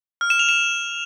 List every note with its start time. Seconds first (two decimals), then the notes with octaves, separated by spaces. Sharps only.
0.21 F6
0.30 E7
0.39 F7
0.49 E7